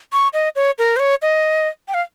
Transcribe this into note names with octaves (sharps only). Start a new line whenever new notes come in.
C#6
D#5
C#5
A#4
C5
C#5
D#5
G5
F5